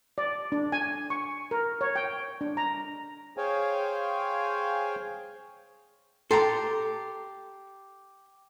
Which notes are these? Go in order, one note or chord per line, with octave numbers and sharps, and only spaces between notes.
D5
D4
G#5
C#6
A#4
C#5
G5
D4
A#5
G#4 C5 C#5 F5 G5 G#5
G4 A4 A#5 C6